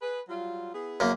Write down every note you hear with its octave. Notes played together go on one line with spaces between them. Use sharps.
G#4 B4
F#3 G3 F4
B3 E4 G#4
F#2 A#3